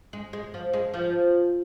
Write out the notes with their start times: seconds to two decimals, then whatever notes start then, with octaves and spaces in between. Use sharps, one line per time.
0.13 G#3
0.33 G#3
0.54 F3
0.73 G#3
0.94 F3